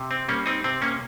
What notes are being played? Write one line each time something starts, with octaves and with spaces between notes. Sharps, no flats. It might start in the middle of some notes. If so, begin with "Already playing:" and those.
Already playing: C3
C4
G3 A#3 C#4
C4 D#4
C3 C4
A#3 C#4